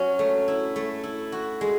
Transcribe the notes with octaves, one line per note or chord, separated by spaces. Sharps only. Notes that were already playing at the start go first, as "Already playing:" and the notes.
Already playing: F#3 C#4
A3
E4
A3
E4
F#4
G#3